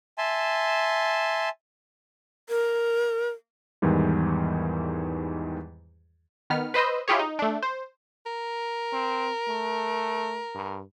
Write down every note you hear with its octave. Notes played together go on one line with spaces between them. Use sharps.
E5 G#5 A5 C6
A#4
E2 G#2 D#3 E3 G3
D#3 B3 F6
B4 C5 D#5 E6 G6
E4 F4 G4 G#4 C#5
D#4
A3 D4
C5
A#4
C4
A3
G2